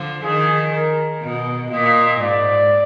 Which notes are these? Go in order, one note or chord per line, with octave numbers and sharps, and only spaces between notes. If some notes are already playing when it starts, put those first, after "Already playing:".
Already playing: D3 F3
D#3 G#4
A#4
B2 D#5
A#2 D#5
G#2 D5